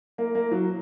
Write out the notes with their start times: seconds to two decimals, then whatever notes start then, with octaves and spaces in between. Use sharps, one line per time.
0.18 A#3
0.35 A#3
0.51 F#3